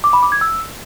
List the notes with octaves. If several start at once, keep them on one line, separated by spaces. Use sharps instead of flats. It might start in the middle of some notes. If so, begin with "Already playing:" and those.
D6
B5
D6
G#6
E6